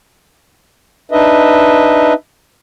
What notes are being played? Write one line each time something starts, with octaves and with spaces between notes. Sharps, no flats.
D4 D#4 B4 D#5 E5